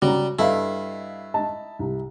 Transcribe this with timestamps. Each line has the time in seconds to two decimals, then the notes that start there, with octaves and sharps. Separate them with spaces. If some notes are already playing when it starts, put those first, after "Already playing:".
0.02 C#3 G3 F#4 A#5
0.39 G2 E4 A4 D#5 F5
1.34 D#5 A5
1.79 C2